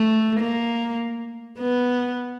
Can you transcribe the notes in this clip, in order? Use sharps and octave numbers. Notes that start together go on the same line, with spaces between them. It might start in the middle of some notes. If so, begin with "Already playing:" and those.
Already playing: A3
A#3
B3